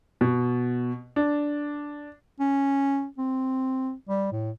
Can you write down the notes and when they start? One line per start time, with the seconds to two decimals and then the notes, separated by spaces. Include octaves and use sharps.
0.21 B2
1.16 D4
2.40 C#4
3.18 C4
4.09 G3
4.32 A2